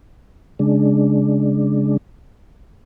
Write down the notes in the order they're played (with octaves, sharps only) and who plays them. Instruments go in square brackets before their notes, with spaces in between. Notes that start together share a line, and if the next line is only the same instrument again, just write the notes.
[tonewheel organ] C#3 G#3 D4